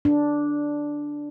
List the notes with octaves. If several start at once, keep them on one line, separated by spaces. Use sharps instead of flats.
D4